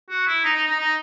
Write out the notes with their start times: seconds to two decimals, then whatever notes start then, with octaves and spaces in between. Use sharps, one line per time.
0.10 F#4
0.27 E4
0.44 D#4
0.56 D#4
0.67 D#4
0.79 D#4